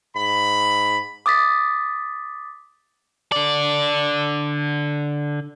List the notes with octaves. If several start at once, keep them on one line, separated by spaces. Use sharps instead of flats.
G#2 B5
D6 D#6 A6 B6
D3 D5